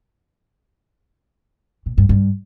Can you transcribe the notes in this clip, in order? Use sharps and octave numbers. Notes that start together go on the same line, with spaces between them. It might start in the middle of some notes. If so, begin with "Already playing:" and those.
A#2
G2
G2